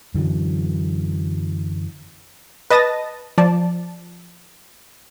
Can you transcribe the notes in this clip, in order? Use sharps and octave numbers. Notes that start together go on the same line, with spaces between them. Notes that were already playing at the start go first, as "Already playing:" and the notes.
F#2 D3 E3 F#3
B4 D#5 A5 D#6 A6 A#6
F3 D5 A5